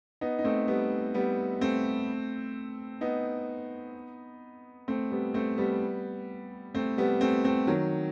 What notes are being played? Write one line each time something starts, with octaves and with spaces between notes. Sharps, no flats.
B3 D#4
D#4
A3 C4
G3 B3
G3 B3
A3 C4
B3 D#4
A3 C4
G3 B3
A3 C4
G3 B3
A3 C4
G3 B3
A3 C4
A3 C4
D#3 F#3